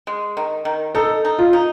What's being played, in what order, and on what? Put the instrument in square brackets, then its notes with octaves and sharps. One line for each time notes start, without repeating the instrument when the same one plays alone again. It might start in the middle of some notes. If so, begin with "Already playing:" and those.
[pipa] G#3
D#3
D#3
[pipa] D#4 [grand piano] A4
[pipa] D#4
[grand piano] F4
[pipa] D#4